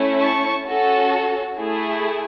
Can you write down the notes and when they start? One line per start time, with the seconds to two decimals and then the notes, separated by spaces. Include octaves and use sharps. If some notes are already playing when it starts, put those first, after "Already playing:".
Already playing: A3 C#4 E4
0.22 A5 C#6
0.67 C#4 F#4 A4
1.58 A3 E4 G#4